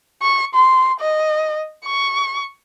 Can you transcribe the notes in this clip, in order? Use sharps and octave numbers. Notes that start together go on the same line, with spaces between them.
C#6
C6
D#5
C#6